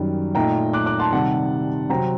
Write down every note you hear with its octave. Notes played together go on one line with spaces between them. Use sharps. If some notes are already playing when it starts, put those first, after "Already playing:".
Already playing: F#2 D#3 G3
A#2 A3 D#4 G5 A#5
D6 F#6
D6 F#6
A5 C6
C3 D#3 G3 F#5 A5
C3 F#3 C4 G5 A#5